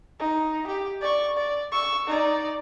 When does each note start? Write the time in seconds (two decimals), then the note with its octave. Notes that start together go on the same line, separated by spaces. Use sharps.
0.20 D#4
0.67 G4
1.01 D5 C#6
1.37 D5
1.72 C#6 E6
2.08 D#4 D5